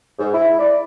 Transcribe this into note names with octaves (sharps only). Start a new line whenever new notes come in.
G#2
E4
D5